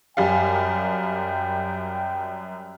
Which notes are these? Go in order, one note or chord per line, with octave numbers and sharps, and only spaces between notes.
F#2 G3 F5 G5